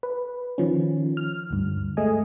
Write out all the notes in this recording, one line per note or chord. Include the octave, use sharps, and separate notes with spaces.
B4
D#3 F3 C#4
F6
D2 G2
G#3 A3 D#5 G#5